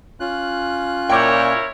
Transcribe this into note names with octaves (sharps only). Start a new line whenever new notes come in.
C#4 F4 F#6
A#2 E4 A#4 C#5 G5 D6 G6